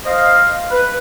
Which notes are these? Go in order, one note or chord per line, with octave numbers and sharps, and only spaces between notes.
C5 D#5 F5
B4